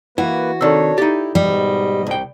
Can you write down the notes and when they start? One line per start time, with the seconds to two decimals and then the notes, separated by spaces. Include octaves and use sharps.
0.18 E3 A#3 F#4 B4
0.61 C3 D#3 D4 A4 C#5 D5 E6
0.98 D#4 E4 G4 A6
1.35 G#2 B2 G3 D#5
2.07 C2 G5